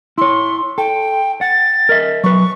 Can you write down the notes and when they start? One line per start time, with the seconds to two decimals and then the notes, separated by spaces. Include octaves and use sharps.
0.18 E4 C#5 C6
0.78 A4 G5
1.41 F#5 A6
1.89 A#4 D#5 E5
2.24 F#3 B4 C#6